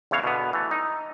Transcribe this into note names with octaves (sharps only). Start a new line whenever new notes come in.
E2 C#3 E3 C#5 F5
B2 D3 B3
E3 A3
D#4